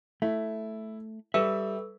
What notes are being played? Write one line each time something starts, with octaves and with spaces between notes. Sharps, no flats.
A3 E4
G3 A4 B4 E5 E6